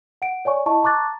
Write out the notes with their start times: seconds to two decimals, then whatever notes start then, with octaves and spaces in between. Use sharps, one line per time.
0.22 F#5 D7
0.45 C#5 D5 G#5 C#6
0.66 E4 D#5 A5 C#6
0.83 A5 A#5 C#6 D6 F#6 A6